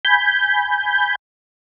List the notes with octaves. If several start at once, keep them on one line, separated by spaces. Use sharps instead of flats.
G#5 B5 G6